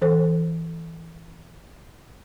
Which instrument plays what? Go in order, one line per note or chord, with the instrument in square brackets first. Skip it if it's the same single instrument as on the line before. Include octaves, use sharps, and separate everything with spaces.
[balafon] E3 A4 C5